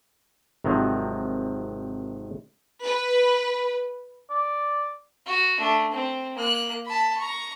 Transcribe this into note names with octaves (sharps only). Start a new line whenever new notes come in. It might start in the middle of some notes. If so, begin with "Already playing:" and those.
G#1 C3 D#3 F3 F#3
B4
D5
F#4
A3 D4
C4
A#3 F#6
A5 B5
A#5 C#6